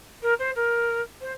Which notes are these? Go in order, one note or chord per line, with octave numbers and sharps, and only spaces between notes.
A#4
C5
A#4
C5